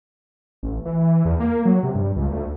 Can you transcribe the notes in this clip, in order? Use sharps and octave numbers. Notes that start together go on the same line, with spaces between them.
A1
E3
E2
A#3
F#3
C3
G2
C#2
D2